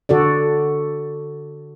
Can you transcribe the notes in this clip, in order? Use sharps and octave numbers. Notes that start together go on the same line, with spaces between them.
D3 F#4 A4 D5